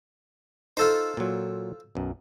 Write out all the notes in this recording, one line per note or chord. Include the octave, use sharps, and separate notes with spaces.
D#4 F4 A4 C5
A#2 F#3
B1 F#2